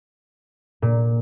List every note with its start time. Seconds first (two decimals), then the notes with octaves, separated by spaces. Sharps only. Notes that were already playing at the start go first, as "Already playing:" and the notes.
0.82 A#2